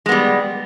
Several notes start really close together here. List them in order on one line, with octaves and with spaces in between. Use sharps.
G#3 B3 G3